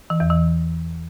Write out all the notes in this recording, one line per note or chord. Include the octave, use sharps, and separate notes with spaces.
E3
E2
E3